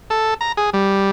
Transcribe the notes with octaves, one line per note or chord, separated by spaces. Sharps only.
A4
A#5
G#4
G3